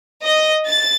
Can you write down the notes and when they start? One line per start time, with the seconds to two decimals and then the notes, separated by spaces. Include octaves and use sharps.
0.23 D#5
0.67 A6